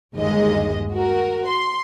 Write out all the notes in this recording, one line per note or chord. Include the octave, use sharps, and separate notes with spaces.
G1 D#2 G#3 D#5
F#4 A#4
C6